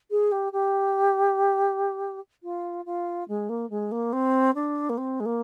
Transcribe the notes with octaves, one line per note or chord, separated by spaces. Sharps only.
G#4
G4
G4
F4
F4
G#3
A#3
G#3
A#3
C4
D4
A#3
C4
G#3
A#3